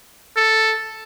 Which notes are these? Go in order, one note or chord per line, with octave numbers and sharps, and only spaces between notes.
A4